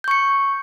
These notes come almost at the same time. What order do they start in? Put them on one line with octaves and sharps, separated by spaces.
G6 C#6 C#7